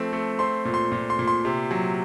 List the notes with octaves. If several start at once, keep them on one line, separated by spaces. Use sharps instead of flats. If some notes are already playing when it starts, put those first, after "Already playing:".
Already playing: F3 A3 C4
A3
C4 C6
A#2
C6
A#2
C6
A#2
C6
C3
F#3